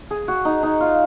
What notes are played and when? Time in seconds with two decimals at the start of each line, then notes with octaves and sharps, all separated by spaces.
0.11 G#4
0.28 F#4
0.45 D#4
0.63 D#4
0.80 F4